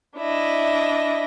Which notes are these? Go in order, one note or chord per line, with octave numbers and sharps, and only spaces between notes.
D4 E4 D#5